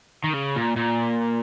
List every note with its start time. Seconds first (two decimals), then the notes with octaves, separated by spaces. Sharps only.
0.24 D#3
0.33 C#3
0.56 A#2
0.76 A#2